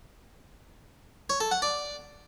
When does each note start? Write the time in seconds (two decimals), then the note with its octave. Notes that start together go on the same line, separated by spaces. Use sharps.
1.30 C#5
1.40 A4
1.51 F#5
1.62 D5